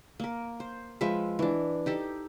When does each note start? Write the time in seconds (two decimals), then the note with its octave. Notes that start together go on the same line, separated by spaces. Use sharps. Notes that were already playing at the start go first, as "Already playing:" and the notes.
0.20 A#3 A#4
0.60 C5
1.01 F3 G#3 B4 E5
1.39 E3 D4
1.86 D#4 G4 A4